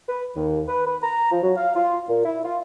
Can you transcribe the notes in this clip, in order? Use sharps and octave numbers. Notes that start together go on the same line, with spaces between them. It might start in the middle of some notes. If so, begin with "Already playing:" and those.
B4
D#2
B4
B4
A#5
F3
F#3
F5
F4
A#2
E4
F4